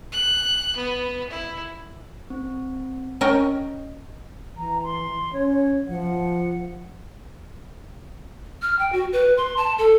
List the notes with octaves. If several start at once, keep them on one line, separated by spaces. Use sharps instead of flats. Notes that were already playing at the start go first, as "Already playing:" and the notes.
F#6
B3
E4
C4
C#4 A#4 D#5 G5
E3 A#5
C6
C#4 C#5
C#5
F3 F#5
F6
G5
F#4
B4
C6
A5
A4